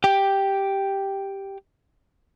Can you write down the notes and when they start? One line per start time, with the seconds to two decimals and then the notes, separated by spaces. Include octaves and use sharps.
0.04 G4 G5